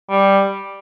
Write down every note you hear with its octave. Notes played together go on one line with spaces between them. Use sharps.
G3